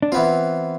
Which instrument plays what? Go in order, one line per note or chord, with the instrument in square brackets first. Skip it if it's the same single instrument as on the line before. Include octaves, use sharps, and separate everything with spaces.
[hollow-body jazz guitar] D4
[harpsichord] E3 B3 F4 [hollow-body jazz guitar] C4